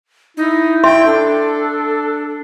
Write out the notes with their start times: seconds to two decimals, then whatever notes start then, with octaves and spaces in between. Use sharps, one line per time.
0.37 D#4 E4
0.84 E5 G5 C6
1.06 D4 A4